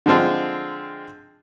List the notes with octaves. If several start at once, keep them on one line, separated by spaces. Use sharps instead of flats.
D3 F3 G#3 C4 F4